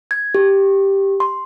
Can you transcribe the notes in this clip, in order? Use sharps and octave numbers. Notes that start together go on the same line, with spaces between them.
G#6
G4
C6